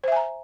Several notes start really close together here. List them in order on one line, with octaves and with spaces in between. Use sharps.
C5 E5 G#5 A#5